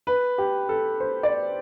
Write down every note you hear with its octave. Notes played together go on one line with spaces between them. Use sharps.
B4
G4
A4
C5
D5